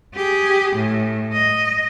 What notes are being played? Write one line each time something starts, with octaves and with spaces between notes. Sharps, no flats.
G4 G#4
A2
D#5